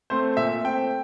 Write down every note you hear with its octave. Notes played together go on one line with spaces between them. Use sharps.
A3 C4 C5
A#2 E5
A3 C4 G5